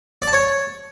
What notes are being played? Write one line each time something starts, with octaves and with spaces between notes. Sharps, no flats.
D5
A5
C#5